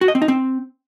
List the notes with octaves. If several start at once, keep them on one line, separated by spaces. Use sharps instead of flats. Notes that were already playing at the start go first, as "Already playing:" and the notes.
F#4
D#5
C4
D#4
C4